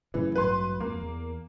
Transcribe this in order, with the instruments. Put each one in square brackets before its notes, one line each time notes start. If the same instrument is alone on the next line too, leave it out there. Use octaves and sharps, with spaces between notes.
[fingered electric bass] F#2 A2 C#3 [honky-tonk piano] E3
[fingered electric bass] A1 G2 F#3 [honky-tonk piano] B4 C6
[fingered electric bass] F2 [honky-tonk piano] A#3
[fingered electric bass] E2